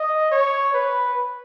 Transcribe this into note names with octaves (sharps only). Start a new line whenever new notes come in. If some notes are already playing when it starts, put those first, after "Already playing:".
Already playing: D#5
C#5
B4